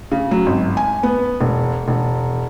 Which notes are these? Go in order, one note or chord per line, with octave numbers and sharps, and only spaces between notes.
C#3
F#3
G#1
G#5
B3
E1
E1